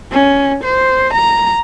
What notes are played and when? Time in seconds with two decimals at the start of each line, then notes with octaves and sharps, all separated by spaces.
0.12 C#4
0.64 C5
1.14 A#5